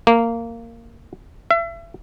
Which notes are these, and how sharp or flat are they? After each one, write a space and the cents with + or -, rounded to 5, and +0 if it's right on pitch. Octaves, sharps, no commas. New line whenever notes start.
A#3 -15
E5 +35